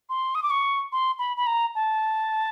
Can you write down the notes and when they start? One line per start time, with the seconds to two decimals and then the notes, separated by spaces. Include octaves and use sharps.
0.09 C6
0.35 D#6
0.43 D6
0.50 C#6
0.92 C6
1.19 B5
1.37 B5
1.47 A#5
1.75 A5